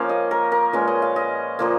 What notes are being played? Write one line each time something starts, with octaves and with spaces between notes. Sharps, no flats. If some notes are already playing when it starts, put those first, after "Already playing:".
Already playing: F3 A#3 C#4 F5
D#5
A#4
A#4
A#2 G#3 C#4 B4
D#5
F5
D#5
A#2 F3 A#3